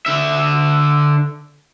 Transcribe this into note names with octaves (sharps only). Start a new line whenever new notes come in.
D3 E5